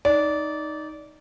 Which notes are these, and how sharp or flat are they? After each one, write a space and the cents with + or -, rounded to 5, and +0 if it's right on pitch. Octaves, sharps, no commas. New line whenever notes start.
D#4 +0 D5 -20